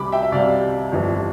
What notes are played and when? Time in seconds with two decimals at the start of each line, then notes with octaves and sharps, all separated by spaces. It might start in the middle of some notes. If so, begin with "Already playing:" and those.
Already playing: C2 C3 G3 B5 D6
0.12 E5 G5
0.23 E5
0.32 C2 C3 G3 D5 F5
0.92 G1 F2 E3 G3